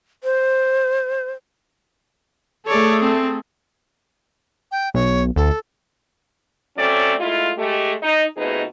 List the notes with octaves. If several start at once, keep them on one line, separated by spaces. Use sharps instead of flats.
C5
A3 G#4 A4 C#5 D5
C4
G5
B1 C#5
D2 A4
F#3 A3 C4 C#4 A4 D5
G#3 A3 E4 F4
G#3 A3 G4
D#4
F2 B2 A3 D#4 G#4 B4